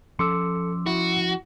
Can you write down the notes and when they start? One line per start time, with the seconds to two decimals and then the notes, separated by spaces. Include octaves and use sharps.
0.19 F3 C#4 A4 C6 D6 E6 C#7
0.86 E4 F#4